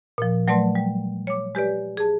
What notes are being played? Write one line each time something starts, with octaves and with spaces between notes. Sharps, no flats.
A#2 F3
F#3 A3 B4 D5 A5 C6
G3
C#5 D6
G#3 G4 B4 D5
G#4 A5